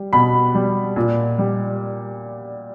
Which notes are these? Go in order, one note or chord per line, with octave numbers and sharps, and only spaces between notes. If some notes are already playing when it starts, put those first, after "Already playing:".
Already playing: G3
B2 B5
G3
A#2
G3